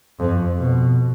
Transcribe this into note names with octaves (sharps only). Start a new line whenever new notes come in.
F2
B2